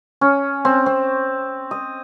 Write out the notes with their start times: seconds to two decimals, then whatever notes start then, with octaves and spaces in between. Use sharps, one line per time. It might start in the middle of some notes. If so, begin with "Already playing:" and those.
0.21 C#4
0.65 C4
0.86 C4
1.71 D#5